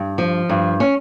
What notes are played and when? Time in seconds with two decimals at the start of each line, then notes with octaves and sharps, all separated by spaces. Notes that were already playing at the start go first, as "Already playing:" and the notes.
Already playing: G2
0.18 F3
0.49 G2
0.80 C#4